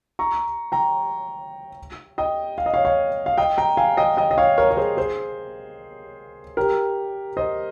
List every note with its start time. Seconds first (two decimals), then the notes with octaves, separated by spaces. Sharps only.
0.19 A#5 C#6
0.72 G5 A#5
2.18 D#5 G5
2.58 F5
2.66 D#5
2.74 C#5 F5
2.85 C#5 F5
3.26 F5
3.38 D#5 G5
3.58 G5 A#5
3.77 F5 G#5
3.97 D#5 G5
4.17 D#5 G5
4.31 D#5
4.38 C#5 F5
4.58 A#4 C#5
4.71 C#5
4.77 G#4 C5
4.97 G#4 C5
6.57 G4 A#4
7.37 C5 D#5